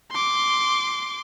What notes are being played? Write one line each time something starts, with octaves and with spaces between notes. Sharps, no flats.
C6 D6